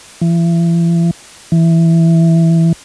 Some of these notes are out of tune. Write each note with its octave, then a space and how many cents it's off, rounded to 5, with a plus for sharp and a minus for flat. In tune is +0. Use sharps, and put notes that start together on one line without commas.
E3 +40
E3 +5